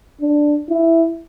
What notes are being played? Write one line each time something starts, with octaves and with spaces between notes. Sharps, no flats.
D4
E4